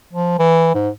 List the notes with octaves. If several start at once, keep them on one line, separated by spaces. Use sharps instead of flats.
F3
E3
G#2